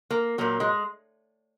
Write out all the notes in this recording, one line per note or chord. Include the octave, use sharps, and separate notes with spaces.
A#3
A#2 F#3 A#3
G#3